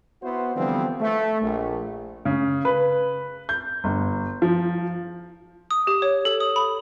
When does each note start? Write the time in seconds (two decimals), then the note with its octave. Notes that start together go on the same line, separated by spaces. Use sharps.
0.22 B3 E4 F#4 C5
0.56 D3 E3 F3 G3 B3 C4
1.00 A3
1.41 A#1
2.25 C#3
2.65 B4
3.49 G6
3.84 G1
4.42 F3
5.71 D#6
5.87 G4
6.02 C#5
6.25 A4
6.40 D#6
6.56 B5